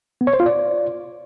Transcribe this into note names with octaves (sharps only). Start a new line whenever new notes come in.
B3
C#5
C5
F4
D5